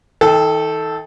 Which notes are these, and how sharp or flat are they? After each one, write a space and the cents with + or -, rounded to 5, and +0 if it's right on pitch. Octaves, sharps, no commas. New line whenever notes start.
D#3 +45 A4 +0 G5 +0